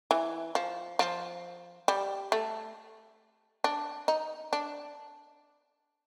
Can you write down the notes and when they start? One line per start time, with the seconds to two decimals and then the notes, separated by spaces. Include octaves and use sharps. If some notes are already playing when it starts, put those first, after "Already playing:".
0.11 E3
0.55 F3
0.99 F3
1.88 G3
2.32 A3
3.64 D4
4.08 D#4
4.53 D4